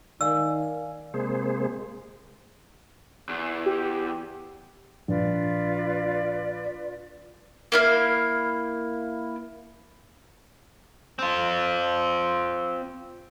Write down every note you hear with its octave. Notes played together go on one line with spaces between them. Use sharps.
D#3 D5 F5 G#5 E6
C3 G#3 A#3 G#4 C5
E2
G4
A#1 F4 B4 D5
A#3 E4 F5
C4 F4